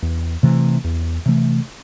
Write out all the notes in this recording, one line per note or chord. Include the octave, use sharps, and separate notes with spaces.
E2
C3 E3 A3
E2
C3 E3 A3